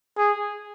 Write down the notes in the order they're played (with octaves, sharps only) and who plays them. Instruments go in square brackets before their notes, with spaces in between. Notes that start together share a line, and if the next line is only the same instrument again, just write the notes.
[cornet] G#4